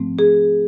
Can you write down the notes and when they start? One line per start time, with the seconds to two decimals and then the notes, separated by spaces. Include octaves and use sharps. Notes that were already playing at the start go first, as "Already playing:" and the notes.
Already playing: G#2 F3 A3 C4
0.19 G#4